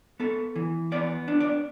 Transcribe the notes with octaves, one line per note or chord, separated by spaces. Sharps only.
B3 A4
E3
B3 D5
D4
D5